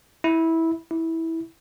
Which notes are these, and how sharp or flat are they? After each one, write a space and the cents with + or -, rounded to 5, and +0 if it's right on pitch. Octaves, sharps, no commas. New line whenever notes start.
E4 -15
E4 -15